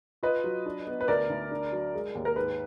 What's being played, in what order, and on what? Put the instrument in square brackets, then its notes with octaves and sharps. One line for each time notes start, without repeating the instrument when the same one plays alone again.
[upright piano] F4 B4 D#5
F#3
D4
B3
B4
D2 A#4 D5
D2
D4
F#3
G#3
D#2
A#4
G#2 B4